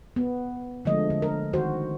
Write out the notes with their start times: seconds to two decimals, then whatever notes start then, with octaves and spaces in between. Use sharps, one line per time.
0.16 B3
0.85 D3 F3 G#3 A3 D#5
1.10 D3
1.22 A#4
1.53 D#3 F#4 C5